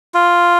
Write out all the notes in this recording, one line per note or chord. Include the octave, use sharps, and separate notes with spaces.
F4